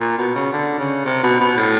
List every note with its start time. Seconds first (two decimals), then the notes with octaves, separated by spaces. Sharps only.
0.01 A#2
0.18 B2
0.35 C#3
0.53 D3
0.79 C#3
1.05 C3
1.23 B2
1.40 B2
1.57 A2